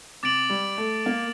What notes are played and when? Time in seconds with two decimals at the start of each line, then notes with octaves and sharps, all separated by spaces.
0.23 C3 D6 A6 D7 F#7
0.50 G3
0.78 A3
1.06 A#3